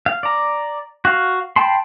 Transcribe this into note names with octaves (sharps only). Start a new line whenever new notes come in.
F5
D5 A#5
F#4 F5
G5 A5 B5 C6